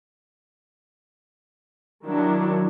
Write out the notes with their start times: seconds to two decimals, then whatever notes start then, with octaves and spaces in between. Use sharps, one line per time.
2.04 D#3 F#3 D4 E4